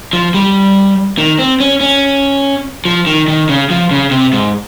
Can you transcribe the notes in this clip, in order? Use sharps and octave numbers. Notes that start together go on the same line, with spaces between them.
F3
G3
D#3
C4
C#4
C#4
F3
D#3
D#3
C#3
F3
C#3
C3
G#2